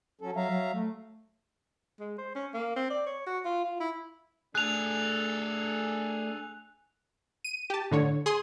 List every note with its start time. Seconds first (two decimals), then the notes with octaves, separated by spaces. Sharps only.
0.21 F#3 C#4 A4
0.36 F#3 E5 F5 A#5
0.50 F#3
0.74 A3
2.00 G#3
2.18 C5
2.36 C#4
2.54 A#3
2.76 C4
2.90 D5
3.07 C#5
3.27 F#4
3.45 F4
3.65 F4
3.80 E4
4.55 A3 D4 G#4 A4 F#6 F7
7.44 D#7
7.70 G4 A5
7.91 A2 D3 C#5
8.26 G#4 C6 D#6